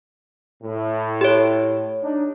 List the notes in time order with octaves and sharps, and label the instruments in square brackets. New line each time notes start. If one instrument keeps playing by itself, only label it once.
[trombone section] A2
[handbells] G4 C#5
[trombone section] D4 D#4